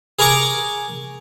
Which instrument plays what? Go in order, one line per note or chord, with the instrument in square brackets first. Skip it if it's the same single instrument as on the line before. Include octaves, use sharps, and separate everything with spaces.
[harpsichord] G#4 A#4 A#5 C#6 D6